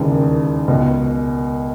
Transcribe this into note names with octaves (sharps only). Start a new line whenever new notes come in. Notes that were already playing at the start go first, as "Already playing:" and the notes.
Already playing: E1 D#2 C#3 E3
C#2 B2